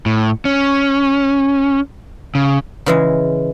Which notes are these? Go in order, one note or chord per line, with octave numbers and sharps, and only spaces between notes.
A2
C#4
C#3
C#3 E3 G#3